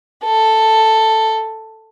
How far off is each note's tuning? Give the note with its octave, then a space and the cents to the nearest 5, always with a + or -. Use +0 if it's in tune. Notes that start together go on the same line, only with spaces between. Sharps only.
A4 +5